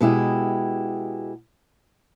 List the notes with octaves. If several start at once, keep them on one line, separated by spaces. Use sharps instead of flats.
B2 G#3 E4 G4